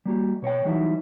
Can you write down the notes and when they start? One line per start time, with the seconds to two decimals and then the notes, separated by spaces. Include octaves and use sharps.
0.06 G3 A#3 F#4 G4
0.42 B2 C#5 D#5 G5
0.65 E3 F#3 G3 D#4 E4 F#4